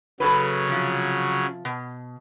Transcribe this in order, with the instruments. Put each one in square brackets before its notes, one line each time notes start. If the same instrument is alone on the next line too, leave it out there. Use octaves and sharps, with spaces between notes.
[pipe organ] C#3 F#3 [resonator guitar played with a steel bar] A4 B4
[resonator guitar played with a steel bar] C3 F3
B2